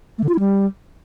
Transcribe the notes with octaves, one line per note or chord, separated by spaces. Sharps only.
A3
D3
F4
E4
G3